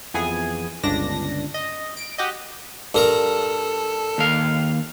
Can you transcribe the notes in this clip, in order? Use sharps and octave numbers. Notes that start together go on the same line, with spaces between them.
F2 E3 B3 G#4 G#5
G1 C#2 D4 A#6
D#5
D7
F#4 G4 D#5
G2 A4 A#4 A#5
D#2 F5